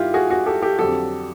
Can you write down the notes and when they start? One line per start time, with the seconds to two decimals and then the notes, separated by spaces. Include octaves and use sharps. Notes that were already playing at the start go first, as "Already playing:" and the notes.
Already playing: G2 D#3 E4 F4 G4
0.14 F#4 G#4
0.30 F#4 G#4
0.46 G4 A4
0.62 G4 A4
0.79 F2 D3 F#3 G4 A4